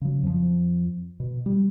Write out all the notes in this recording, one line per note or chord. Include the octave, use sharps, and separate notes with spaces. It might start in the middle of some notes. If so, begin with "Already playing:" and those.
C#3 F#3
F2 F3
B2
G3